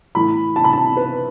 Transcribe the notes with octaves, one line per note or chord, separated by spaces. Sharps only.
A2 E3 B5
A5
B5
A5
B4